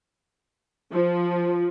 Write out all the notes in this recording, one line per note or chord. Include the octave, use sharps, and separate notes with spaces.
F3